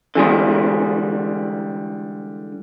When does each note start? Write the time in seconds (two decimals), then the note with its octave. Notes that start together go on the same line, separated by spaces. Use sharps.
0.15 D3 E3 G3 G#3